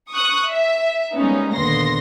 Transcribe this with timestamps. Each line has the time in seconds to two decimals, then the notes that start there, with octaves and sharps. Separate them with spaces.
0.11 C#6 D#6 F#6
0.48 E5
1.13 G3 G#3 A#3 B3 C#4 D#4
1.53 D#2 A#2 D3 B3 C6 A#6